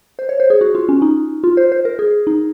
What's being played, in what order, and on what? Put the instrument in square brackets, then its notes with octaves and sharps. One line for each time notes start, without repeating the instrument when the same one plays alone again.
[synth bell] C5
C#5
C5
G#4
F#4
F4
C#4
D#4
F4
C5
C5
A#4
G#4
D#4